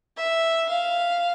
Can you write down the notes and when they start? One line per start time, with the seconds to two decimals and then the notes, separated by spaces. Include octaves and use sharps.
0.17 E5
0.70 F5